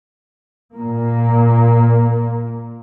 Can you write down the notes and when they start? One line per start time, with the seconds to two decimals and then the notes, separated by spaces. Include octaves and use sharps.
0.76 A#2 A#3